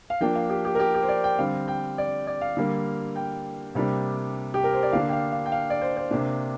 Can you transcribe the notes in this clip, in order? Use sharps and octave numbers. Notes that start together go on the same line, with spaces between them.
F5
F3 A#3 D4 G5
F5
G4
G4
A#4
G4
G4
C5
D5
G5
D3 G3 C4 F5
G5
D5
D5
F5
D3 G3 A#3
G5
C3 G3 A#3 D4
G4
A#4
C5
D5
D3 A#3 D4 F5
G5
F5
F5
G5
F5
D5
C5
C5
C3 A#3 D4